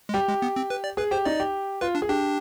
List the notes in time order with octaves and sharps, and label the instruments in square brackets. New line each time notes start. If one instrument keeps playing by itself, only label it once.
[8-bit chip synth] G#3
[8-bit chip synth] G3 [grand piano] G4
[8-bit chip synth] G#3
B3
C4
B4
D5
[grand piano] G#4 [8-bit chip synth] B4
[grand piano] G4 [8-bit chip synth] C5
[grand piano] D#4 [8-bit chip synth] D5
[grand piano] G4
[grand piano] F4 [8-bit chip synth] B4
[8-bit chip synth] D4
[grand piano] G#4
[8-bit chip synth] D4 [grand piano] G4